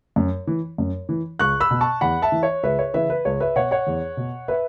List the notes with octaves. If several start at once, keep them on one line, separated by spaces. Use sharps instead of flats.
F#2
E3
F#2
E3
C#2 C#6 F#6
B5 E6
B2
A5 C#6
E2 F#5 B5
E5 A5
E3
C#5
C#2 B4 E5
C#5
C#3 E3 B4 E5
B4
C#2 C#5
B4 E5
B2 C#5 F#5
C#5 F#5
E2
B2
B4 E5